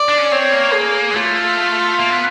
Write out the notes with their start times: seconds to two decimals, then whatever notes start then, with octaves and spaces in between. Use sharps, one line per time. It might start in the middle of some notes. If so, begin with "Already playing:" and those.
Already playing: D5
0.09 D4
0.18 C#4
0.32 C4 C#5
0.52 A#3
0.73 G#4
1.11 G#3
1.15 A3 F4
1.99 A#3
2.10 B3